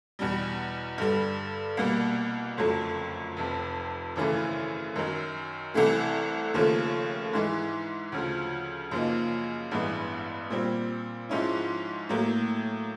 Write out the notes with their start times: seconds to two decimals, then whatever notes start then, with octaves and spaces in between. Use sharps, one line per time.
0.19 E2 B2 G3
0.98 G2 D3 G3
1.77 C2 B2 G3 A#3
2.57 F#1 F2 D3 F#3 A3
3.37 F1 F2 C3
4.16 G#1 F#2 C#3 E3 A3
4.96 F#2 D#3 F#3
5.74 C2 C3 E3 A3
6.54 D#2 C#3 F3 A3
7.33 G#2 E3 G#3
8.12 D2 C#3 F3
8.91 F#2 C#3 F3 A#3 D#4
9.71 A1 G2 E3 G#3 B3
10.50 A#2 G3 C4
11.29 G#2 F3 G#3 C#4 E4
12.09 A2 F#3 A#3